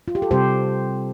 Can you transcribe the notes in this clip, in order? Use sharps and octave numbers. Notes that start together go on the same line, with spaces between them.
F4
G4
A4
C3 G3 C4 G4 C5